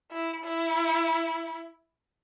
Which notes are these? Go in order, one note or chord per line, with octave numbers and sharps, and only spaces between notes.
E4
E4